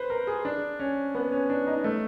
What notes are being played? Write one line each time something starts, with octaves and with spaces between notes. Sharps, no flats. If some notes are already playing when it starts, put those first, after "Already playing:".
Already playing: B4 C5
A#4
G#4
D4
C#4
B3
C#4
D4
D#4
A3